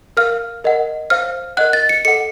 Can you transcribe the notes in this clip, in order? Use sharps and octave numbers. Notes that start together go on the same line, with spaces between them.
A#4 F5 F6
A#4 D#5 F#5
C5 F5 F6
A#4 D#5 F#5 F#6
A6
C#7
A4 D#5 F#5 C#7